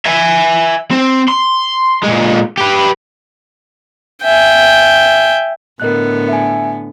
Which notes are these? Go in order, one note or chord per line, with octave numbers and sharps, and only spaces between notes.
E5 G#5
C4
C6
A#2 G#3
G4 B4
E5 G5 G#5
A2 D3 B3 A#4 D#5 F#6
E5 G#5